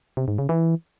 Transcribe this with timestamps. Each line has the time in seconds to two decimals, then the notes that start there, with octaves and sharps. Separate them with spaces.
0.17 C3
0.28 G#2
0.38 C#3
0.49 E3